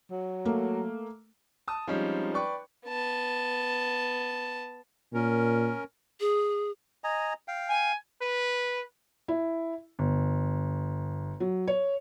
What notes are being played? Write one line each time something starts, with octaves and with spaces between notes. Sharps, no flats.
F#3
A3 A#3
A5 D#6
F3 G3 G#3 C4 C#4 D#4
B4 D5 G5 C#6
B3 A5
A#2 C#4 A#4
G#4
D#5 G#5 A#5
F5 G5
G#5
B4
E4
G1
F#3
C#5